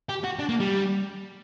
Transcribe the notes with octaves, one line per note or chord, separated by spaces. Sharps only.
G4
F#4
D4
A#3
G3